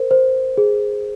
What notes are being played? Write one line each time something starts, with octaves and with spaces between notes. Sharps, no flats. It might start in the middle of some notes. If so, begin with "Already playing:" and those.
Already playing: A#4 C5
C5
G#4